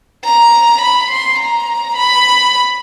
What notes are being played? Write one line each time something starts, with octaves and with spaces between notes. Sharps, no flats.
A#5
B5
C6
A#5
B5